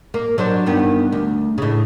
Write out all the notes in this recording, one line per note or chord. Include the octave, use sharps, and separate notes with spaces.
A#3
F#3 D4 C5
G2 D#3 B3
D2
A2 C#3